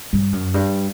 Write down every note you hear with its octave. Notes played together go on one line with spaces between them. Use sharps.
G2
F#2
G2